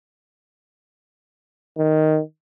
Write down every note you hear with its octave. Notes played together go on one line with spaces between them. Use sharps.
D#3